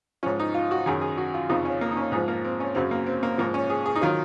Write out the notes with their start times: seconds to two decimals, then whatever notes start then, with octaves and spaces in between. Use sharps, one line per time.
0.23 G#2 F3 C#4
0.40 D#4
0.54 F4
0.71 F#4
0.86 F#2 D#3 F#3 G#4
1.01 G#4
1.17 F#4
1.34 F4
1.49 F2 C#3 F3 D#4
1.65 C#4
1.81 A#3
1.91 D#4
1.97 C#4
2.12 G#2 G#4
2.16 F3
2.28 A#3
2.44 C4
2.60 C#4
2.75 F#2 C#3 F#3 C4
2.91 A#3
3.06 C4
3.23 A#3
3.38 G#2 F3 A#3
3.54 C#4
3.70 G#4
3.86 G#4
3.96 D#4
4.01 D#3 F#3 F4